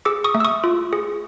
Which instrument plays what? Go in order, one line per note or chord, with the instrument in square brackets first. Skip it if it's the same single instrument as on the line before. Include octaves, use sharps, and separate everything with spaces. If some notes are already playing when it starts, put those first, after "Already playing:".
[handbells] G#4 D6 E6
C#6 D#6
A3
E6
C#6 D#6
F4
G#4